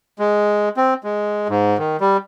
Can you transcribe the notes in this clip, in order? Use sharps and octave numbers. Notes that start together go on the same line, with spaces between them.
G#3
C4
G#3
G#2
D#3
G3